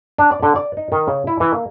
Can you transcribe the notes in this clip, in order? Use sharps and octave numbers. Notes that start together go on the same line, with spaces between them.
D4
D5
D3
D5
D#4
D#3
C#3
E4
E3
A#3